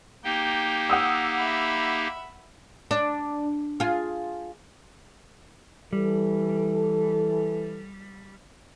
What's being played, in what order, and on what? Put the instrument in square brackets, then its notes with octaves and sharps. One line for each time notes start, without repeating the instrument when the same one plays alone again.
[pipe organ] A#3 D#4 G4 [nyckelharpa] G5
[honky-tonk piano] F#5 D#6 E6
[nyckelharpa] E5 B5
[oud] D4
F4 G#4
[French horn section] E3 A4 [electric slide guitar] G3